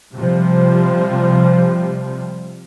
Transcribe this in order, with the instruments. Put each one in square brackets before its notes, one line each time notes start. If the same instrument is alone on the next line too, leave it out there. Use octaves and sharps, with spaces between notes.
[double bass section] C3 F3 G3